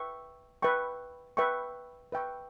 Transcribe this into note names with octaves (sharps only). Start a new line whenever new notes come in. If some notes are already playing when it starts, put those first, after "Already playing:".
Already playing: B4 E5 G5 C#6
B4 E5 G5 C#6
B4 E5 G5 C#6
B4 E5 G5 C#6